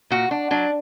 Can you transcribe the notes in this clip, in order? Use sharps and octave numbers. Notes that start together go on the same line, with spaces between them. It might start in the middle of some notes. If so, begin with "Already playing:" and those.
A#2 F#4
D4
F#3 D4